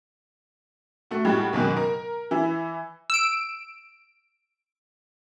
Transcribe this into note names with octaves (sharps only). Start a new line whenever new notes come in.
A3 F#4
A2 G3 G#3 F#4
F#1 G#2 B2 D#3
A#4
E3 E4
E6 D7